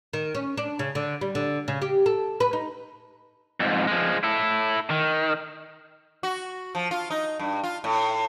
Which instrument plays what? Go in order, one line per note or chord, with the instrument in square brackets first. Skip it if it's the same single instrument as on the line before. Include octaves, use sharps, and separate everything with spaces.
[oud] D#3
C#4
D4
C#3
D3
G3
D3
C#3
G4
A4
B4
D#4
[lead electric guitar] F2 G#2
F3 G#3
E4 A4
D#3
[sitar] F#4
F3
F4
D#4
G2
F4
A2